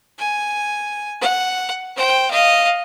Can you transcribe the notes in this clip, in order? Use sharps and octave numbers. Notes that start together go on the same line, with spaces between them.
G#5
F#5
C5 G5
D#5 F5